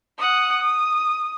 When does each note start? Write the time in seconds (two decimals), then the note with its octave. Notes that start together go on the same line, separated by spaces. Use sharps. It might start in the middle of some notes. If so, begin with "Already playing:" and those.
0.18 F#5 D#6
0.61 D#6